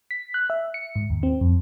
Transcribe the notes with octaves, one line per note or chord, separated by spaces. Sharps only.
B6
F#6
E5
C#7
G#2
D#2
C4
F2